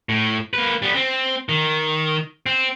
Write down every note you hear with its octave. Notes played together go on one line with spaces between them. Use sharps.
A2
A#3 B4
G3 B3
C4
D#3
C4